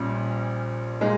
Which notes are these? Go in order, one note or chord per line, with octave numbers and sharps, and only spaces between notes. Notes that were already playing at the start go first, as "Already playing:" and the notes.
Already playing: A#1 A#2 G3 C#4
A#2 G#3 D#4